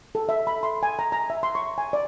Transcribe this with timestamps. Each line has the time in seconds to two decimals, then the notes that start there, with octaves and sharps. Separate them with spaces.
0.15 A4
0.29 E5
0.47 B5
0.63 C6
0.83 G#5
0.99 A#5
1.12 A#5
1.30 E5
1.43 C6
1.55 C#6
1.78 G#5
1.93 D5